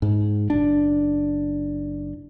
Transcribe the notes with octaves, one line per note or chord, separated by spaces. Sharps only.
G#2
F#1 D4